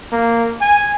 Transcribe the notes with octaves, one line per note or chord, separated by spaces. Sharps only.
A#3
G#5